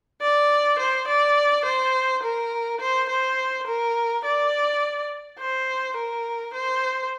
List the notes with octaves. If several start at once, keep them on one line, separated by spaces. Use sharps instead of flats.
D5
C5
D5
C5
A#4
C5
C5
A#4
D5
C5
A#4
C5